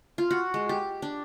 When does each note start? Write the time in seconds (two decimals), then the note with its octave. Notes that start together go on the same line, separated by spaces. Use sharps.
0.18 F4
0.31 F#4
0.54 G#3
0.69 G4
1.02 D4